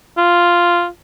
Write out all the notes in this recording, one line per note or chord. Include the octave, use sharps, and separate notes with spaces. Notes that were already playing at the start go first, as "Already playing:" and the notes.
F4